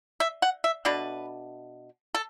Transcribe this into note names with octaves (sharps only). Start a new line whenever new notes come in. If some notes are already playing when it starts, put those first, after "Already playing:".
E5
F#5
E5
B2 A3 D4 B4
A4